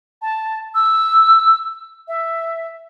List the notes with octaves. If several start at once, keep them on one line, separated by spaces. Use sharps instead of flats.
A5
E6
E5